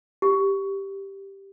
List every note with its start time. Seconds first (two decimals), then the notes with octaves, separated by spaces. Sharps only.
0.22 G4